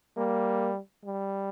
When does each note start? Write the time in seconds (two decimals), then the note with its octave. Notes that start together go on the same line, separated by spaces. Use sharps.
0.17 G3 A#3
1.05 G3